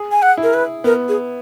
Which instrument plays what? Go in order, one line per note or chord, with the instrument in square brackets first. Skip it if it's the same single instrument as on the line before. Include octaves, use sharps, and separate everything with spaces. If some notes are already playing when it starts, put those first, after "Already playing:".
Already playing: [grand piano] G#4
[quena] G#5
F#5
[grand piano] E4
[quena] A#4
B4
[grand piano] B3 [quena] A#4
[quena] G#4